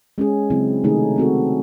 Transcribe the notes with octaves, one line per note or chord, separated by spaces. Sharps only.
G#3 C#4 G#4
C#3 F#3 C4 E4
C3 D#3 A3 D#4 G#4
A3 C4 F#4 A4